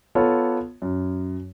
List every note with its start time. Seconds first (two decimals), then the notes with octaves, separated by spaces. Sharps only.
0.15 B3 F4 A4 C#5
0.82 F#2